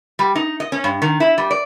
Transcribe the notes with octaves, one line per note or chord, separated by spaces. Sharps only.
G3
D#4
D#5
C#4
G2
D#3
E4
G3
D5